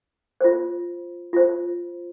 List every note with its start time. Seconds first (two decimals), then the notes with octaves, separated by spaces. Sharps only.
0.41 F4 C5
1.33 F4 C5